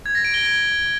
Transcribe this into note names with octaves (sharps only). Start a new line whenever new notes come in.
G#6
A#6
D7
G7
G#6